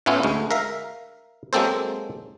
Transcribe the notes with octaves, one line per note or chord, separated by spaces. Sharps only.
A2 A3 B3 C#4 E4 F4
D2 G#3
A#4 E5 F5
F#3 G#3 A#3 C4 A4 C5